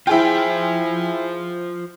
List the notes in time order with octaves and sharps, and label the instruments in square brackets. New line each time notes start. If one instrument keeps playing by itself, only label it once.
[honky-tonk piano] E4 G#4 G5 [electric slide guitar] F4 C5